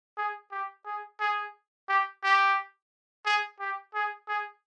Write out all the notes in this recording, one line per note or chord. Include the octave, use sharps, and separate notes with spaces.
G#4
G4
G#4
G#4
G4
G4
G#4
G4
G#4
G#4